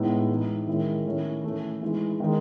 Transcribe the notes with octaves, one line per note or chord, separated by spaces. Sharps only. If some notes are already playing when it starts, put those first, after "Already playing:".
Already playing: A2 G#3 B3 D#4
E3 G#3 D#4
D#3 G#3 C#4 E4
D#3 A3 C#4 E4
E3 A3 C#4
E3 G#3 D#4
D#3 G#3 D#4